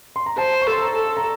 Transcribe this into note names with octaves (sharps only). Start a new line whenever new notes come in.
C6
A#5
C5 A5
C#6
A4 C6
A#5
A4
A#5